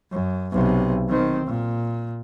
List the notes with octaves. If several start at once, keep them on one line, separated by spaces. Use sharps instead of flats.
F#2
B1 C3
D#3 C4
A#2